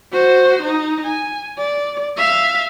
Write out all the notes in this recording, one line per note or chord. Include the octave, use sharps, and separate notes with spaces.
F#4 C5
D#4
G#5
D5
E5 F5